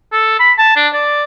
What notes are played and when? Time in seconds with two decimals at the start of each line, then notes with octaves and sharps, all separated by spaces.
0.12 A4
0.40 B5
0.58 A5
0.76 D4
0.93 D5